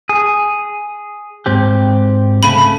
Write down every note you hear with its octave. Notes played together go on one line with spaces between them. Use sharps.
G#4
G#2 C4 G4
C2 C#3 A3 B5